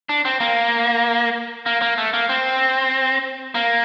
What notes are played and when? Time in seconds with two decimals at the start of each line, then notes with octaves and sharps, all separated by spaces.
0.09 D4
0.25 C4
0.40 A#3
1.66 A#3
1.82 A#3
1.98 A3
2.13 A#3
2.29 C4
3.55 A#3